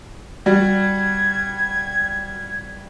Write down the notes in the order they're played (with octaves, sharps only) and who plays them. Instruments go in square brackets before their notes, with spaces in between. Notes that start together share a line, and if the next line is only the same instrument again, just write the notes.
[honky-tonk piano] G3 F#4 [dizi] G#6